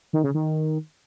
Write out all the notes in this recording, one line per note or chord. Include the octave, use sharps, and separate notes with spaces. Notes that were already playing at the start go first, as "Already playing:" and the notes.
D#3
C#3
D#3